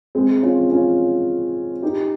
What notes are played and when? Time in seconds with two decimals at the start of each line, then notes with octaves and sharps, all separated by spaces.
0.15 G#3 C4
0.43 C#4 F4
0.70 C#4 F4
1.82 D#4 G4